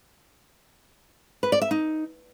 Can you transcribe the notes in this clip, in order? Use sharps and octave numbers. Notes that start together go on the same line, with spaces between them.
B4
D5
E5
D#4